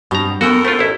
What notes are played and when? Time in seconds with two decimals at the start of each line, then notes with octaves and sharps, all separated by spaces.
0.11 G2 B2 C4 G4 A#5
0.41 F#2 B3 F#4 A4 A#4 F#5 G5
0.65 A3 F4 C5
0.79 A1 E4